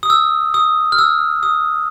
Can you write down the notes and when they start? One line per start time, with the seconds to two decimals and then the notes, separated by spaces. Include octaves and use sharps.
0.03 D#6
0.10 E6
0.54 D#6
0.92 F6
0.98 E6
1.43 D#6